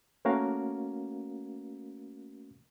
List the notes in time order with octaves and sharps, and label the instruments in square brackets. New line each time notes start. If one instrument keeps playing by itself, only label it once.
[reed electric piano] A3 A#3 C#4 F#4 A#4 F5